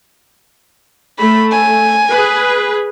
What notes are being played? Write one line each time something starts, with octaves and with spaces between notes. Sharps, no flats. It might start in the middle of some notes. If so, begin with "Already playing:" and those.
A3 B5
G#5
G#4 B4